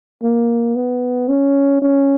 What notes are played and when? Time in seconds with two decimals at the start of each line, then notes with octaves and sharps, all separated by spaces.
0.22 A#3
0.76 B3
1.29 C#4
1.82 C#4